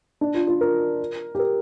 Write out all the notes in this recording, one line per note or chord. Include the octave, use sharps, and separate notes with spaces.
D4
F4
F4
A#4
G4
A#4